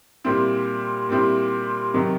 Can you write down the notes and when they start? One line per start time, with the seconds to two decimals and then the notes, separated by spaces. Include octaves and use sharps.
0.24 A#2 G3 C4 E4
1.09 A#2 G3 C4 E4
1.94 C3 D#3 F#3